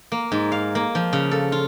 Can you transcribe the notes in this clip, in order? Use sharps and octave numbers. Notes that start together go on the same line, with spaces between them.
A#3
G#2
F5
A#3
F3
C#3
A4
F4